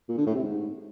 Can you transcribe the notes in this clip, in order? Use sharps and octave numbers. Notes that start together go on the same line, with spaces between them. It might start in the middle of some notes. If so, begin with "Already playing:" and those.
A#2
D3
A2
C3
G#2